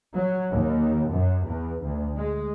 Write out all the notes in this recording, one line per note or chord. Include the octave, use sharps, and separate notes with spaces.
F#3
D#2
F#2
E2
D2
G#3